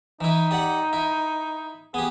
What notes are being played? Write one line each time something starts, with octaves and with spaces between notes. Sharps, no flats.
E3 D#4 E4
G4 D5 F#5
E4
B3 G4 G#4